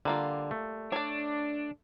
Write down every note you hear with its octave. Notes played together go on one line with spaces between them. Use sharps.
D3 G3 A#3 F4
A3
D4 C#5 D5